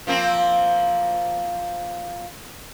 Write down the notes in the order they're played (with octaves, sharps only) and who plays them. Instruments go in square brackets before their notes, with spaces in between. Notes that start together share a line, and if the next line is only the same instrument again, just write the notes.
[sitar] F3 A#3 C4